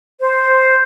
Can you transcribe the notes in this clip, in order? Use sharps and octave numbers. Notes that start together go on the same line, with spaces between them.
C5